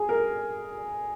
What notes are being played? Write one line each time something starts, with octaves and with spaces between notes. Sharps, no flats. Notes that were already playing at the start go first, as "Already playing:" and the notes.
Already playing: G#4
A#4